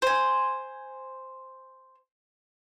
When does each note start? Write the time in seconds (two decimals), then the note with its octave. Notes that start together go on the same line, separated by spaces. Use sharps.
0.02 C5 G#5